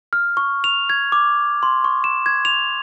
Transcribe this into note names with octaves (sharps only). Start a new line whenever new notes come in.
F6
C#6
F7
G#6
D6
C6
C#6
E7
G#6
F7